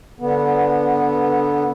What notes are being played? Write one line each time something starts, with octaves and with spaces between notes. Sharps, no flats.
D3 B3